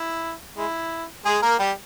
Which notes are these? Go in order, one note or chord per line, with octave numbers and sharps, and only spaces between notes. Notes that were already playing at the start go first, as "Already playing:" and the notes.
Already playing: E4
G#3 E4
G#3 G#4
A#3 A#4
G3 G4